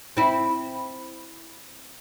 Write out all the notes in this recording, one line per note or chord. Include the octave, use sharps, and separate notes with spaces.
C4 E4